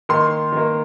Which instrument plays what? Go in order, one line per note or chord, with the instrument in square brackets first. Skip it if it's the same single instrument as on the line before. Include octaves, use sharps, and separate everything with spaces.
[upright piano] D#3 A#3 C6
D#3 A#3